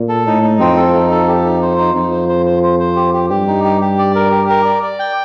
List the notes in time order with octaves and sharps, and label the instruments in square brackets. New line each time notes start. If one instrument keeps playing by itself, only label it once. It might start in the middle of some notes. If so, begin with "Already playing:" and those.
Already playing: [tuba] A#2
[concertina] A4
[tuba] A2 [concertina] D#4
[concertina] D#4
[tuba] F2 [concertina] C4
[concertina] A4
D#4
A4
G4
D#4
C5
D#4
[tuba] F2 [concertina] D#4
[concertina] C5
C5
C5
C5
C5
G4
G4
[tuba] G2 [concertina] G4
[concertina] D#4
G4
G4
D5
A#4
G4
A#4
D5
D5
G5